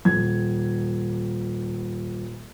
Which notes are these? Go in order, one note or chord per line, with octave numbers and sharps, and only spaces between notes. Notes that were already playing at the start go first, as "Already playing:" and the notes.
D#1 G#6